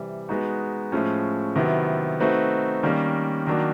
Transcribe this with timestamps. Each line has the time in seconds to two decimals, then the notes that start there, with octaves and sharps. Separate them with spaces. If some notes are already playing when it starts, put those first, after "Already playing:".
Already playing: C3 E3 G3
0.29 G#3 B3 D#4 F#4
0.92 A2 F3 G#3 C#4
1.56 C3 D#3 F#3 B3 E4
2.20 A3 C4 D#4 F#4 B4
2.83 D#3 G3 A#3 C#4
3.47 D#3 F#3 A#3 D4